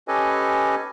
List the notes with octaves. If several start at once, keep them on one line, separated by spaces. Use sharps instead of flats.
C#4 G4 A4 B4 D#5 G#5